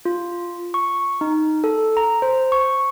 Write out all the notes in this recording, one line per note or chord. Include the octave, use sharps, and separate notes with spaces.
F4
C#6
D#4
A4
A#5
C5
C#6